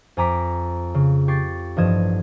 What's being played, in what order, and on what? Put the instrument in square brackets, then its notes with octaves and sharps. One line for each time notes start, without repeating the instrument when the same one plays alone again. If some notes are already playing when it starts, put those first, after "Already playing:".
[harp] F2 G#5 A#5 D6 B6
C#3
G4 C#6 A6 C7
A1 G2 F3 D#5 G#6 E7